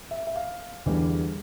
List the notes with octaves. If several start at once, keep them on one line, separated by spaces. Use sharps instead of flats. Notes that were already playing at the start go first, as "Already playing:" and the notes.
E5
E5
F5
E2 D3 G3